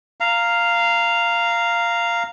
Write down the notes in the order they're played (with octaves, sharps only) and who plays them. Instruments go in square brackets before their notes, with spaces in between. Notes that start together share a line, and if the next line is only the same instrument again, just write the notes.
[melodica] F5 A#5